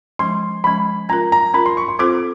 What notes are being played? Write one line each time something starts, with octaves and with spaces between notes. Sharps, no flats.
F3 G#3 C#4 C6
F3 G#3 C#4 B5
C#4 F4 A#4 A#5
A#5
C#4 F4 A#4 B5
C6
C#6
C6
C4 F4 A4 C5 D6